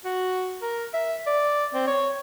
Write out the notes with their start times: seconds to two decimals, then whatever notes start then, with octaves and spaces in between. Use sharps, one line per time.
0.05 F#4
0.62 A#4
0.94 E5
1.27 D5
1.74 C4
1.87 C#5